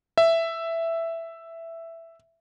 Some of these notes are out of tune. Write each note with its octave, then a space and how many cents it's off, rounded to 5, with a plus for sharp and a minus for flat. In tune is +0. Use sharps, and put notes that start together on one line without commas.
E5 +5